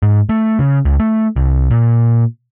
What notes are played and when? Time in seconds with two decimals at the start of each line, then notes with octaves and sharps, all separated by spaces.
0.03 G#2
0.29 A3
0.59 C#3
0.85 C#2
1.00 A3
1.36 C2
1.71 A#2